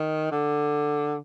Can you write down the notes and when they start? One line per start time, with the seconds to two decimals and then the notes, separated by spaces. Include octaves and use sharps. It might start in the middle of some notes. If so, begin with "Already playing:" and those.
Already playing: D#3
0.32 D3